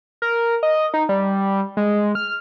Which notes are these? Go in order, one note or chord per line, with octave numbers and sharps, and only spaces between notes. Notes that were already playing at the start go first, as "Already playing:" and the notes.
A#4
D#5
D#4
G3
G#3
F6